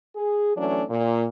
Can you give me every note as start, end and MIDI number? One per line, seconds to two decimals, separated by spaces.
0.16 0.52 68
0.56 0.83 52
0.56 0.83 54
0.56 0.83 57
0.56 0.83 61
0.56 0.83 62
0.90 1.25 46